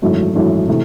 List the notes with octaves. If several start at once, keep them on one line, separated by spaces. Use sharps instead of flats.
G#1 F#2 E3 A3
G#1 F#2 E3 A3
C3 E3 A3